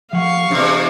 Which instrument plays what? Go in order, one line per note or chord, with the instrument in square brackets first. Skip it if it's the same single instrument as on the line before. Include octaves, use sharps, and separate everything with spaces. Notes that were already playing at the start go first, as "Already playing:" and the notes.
[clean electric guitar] F3 F#5 [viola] F5 C#6
[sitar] E2 C3 [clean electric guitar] D4